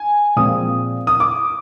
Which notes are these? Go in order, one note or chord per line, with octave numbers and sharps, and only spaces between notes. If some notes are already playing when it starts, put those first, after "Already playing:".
Already playing: G#5
A#2 F3 G#3 C4 D#6
D#6
D6